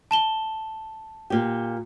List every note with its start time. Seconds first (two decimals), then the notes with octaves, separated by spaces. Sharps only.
0.11 A5 E7 G7
1.30 A#2 G4